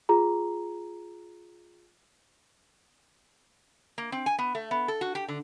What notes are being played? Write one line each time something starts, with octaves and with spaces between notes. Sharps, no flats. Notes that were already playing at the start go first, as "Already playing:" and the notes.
F4 G#4 A#5
A#3
C4
G#5
B3
A3
B3
A4
F#4
G4
D3